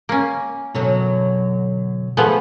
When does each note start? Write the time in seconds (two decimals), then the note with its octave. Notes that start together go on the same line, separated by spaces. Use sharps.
0.09 A#3 C#4
0.74 F#2 B2 D3 F#3
2.17 F3 A3 B3 G#4 A4 F#5 G#5